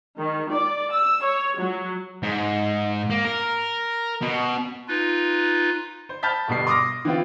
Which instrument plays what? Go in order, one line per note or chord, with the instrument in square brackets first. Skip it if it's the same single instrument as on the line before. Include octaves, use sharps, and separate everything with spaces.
[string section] D#3
D5
E6
C#5
F#3
[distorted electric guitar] G#2
A#3
A#4
B2
[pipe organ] D#4 F4 B4
[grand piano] C5
A5 B5 F6 G6 A6 B6
G1 B2 G3 C7
C6 D6 D#6 F6 A#6
E3 B3 C4 F4